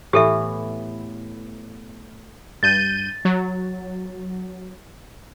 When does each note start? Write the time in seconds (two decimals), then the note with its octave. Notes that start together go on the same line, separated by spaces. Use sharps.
0.13 A2 E3 B3 G4 A4 E5
2.63 G2 G6 A6 D#7
3.25 F#3